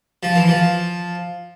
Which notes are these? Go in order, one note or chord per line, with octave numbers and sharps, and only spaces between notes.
F3
E3
F3